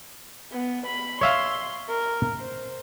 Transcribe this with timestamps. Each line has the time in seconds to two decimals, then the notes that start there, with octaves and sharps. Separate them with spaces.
0.52 B3
0.86 B5
1.21 C#5 E5 F5 C6
1.89 A#4
2.39 C5